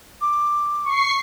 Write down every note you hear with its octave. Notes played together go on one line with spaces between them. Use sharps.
D6
C#6 C7